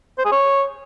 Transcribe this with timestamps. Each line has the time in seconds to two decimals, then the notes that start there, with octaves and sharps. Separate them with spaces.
0.18 C5
0.25 G#4
0.32 C#5